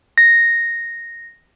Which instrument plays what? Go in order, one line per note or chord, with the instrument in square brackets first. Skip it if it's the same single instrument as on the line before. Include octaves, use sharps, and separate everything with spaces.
[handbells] A#6